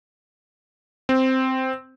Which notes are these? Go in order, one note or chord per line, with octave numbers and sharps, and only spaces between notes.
C4